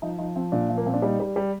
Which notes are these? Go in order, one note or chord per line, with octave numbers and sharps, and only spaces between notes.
F3 D#4
F3 D#4
F3 C4
A#2 D4
F3
A#3
A#2 C4
D4
G3 D#4
G3
G3